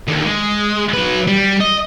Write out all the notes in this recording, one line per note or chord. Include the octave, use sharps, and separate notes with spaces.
D#2 D3
G#3
F#3 B4
G3
D#5